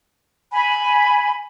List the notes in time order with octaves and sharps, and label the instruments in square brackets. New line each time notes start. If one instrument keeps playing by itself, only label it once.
[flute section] G#5 B5